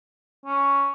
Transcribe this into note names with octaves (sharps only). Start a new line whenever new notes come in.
C#4